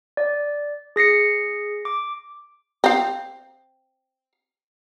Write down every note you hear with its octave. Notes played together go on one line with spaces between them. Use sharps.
D5
G#4 A#6 C7 C#7
D6
C4 F5